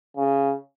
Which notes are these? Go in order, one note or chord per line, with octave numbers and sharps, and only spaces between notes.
C#3